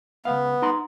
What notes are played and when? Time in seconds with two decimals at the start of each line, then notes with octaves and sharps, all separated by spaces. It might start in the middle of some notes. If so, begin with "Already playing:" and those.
0.25 C#2 G2 B3 F5
0.62 D#4 A#5 C6